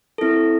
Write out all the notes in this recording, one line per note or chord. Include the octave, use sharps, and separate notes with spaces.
C4 E4 A4